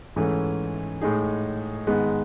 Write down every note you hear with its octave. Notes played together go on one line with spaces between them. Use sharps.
G#2 E3 A3 C#4
A2 G#3 D#4 G#4
G#2 D#3 G#3 B3